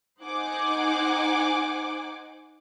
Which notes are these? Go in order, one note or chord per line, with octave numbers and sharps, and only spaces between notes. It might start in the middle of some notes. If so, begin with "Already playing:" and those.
D#4 C5 F#5 G#5 D6